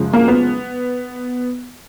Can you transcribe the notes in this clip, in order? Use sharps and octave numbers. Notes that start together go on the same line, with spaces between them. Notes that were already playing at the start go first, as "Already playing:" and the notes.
Already playing: F#2 C#3 F3 G#3
A#3
B3